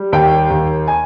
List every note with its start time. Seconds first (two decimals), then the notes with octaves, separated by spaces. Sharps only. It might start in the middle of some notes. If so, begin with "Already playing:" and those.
Already playing: G3
0.12 D#2 G5
0.50 D#2
0.88 G#5